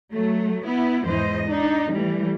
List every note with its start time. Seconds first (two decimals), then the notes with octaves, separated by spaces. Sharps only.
0.13 F#3 A3
0.66 B3 E4
1.05 E2 G#2 E3 C5 D#5
1.47 D4 D#4
1.91 E3 G3 A3